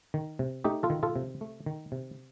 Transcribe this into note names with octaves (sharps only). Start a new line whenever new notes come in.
D#3
C3
A3 D#4 G4
F4 A4
D#3
F4 A4
C3
A3
D#3
C3